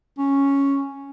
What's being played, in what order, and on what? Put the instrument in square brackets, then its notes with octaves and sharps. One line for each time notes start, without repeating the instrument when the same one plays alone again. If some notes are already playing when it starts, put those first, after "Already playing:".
[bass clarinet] C#4